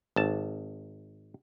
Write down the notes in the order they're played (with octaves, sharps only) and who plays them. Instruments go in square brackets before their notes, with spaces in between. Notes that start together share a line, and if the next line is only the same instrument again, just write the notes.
[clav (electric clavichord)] G#1 A5